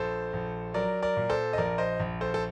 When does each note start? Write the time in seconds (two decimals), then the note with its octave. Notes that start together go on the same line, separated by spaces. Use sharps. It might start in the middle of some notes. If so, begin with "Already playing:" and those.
Already playing: A#1 A4 C5
0.33 A#1
0.74 F#3 A#4 D5
1.02 A#4 D5
1.17 A#2
1.30 A4 C5
1.53 D#5
1.58 A#1 A#4 D5
1.78 C5 D#5
2.00 A#1
2.21 A4 C5
2.34 A4